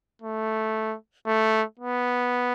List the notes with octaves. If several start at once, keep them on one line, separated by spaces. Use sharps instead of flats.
A3
A3
B3